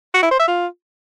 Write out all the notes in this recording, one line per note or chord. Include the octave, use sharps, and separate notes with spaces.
F#4
E4
C5
E5
F4